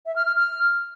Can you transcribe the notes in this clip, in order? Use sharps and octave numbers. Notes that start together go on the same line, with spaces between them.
E5
F6
F6
F6